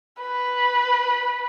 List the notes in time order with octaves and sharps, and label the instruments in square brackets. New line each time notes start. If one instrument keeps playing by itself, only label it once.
[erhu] B4